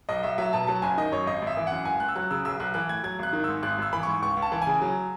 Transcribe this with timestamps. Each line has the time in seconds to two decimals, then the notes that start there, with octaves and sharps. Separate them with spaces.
0.09 B1 D#5
0.23 B1 E5
0.38 F#3 E5
0.53 B2 A5
0.67 F#3 A5
0.82 F#1 G#5
0.98 D#3 D#5
1.12 F#2 C#5
1.26 G#1 D#5
1.42 G#1
1.47 E5
1.57 E3
1.67 F#2 F#5
1.85 C#2 G#5
2.00 C#2 F#6
2.09 E6
2.16 F#3 F#6
2.31 C#3 E6
2.45 B1 E6
2.60 B1 F#6
2.74 E3 F#6
2.89 A2 G#6
3.04 F#3 G#6
3.19 G#1 F#6
3.33 D#3
3.44 G#2 E6
3.63 G#1 F#6
3.78 G#1 E6
3.93 E3 B5
4.03 G#2 C#6
4.22 C#2 C#6
4.37 C#2
4.42 A5
4.52 E3
4.62 G#5
4.67 C#3
4.82 F#3